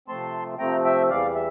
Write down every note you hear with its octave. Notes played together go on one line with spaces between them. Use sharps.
C3 F3 A3 C4 A5 C6
C3 F3 A3 C4 G5 A#5
E5 G5
E2 E3 G3 D5 F5
E5